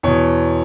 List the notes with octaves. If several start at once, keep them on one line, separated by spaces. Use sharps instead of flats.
E2 B2 C#5